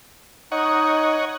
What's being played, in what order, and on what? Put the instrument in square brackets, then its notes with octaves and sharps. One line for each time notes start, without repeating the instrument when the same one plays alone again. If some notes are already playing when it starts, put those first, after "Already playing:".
[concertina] D#4 [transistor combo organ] C#5 D#5 F#5